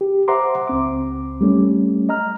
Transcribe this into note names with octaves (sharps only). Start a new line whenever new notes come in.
G4
C5 E5 F#5 A#5 C6 D6
C#2 C4 D6
G3 A3 C#4
D#5 A#5 F6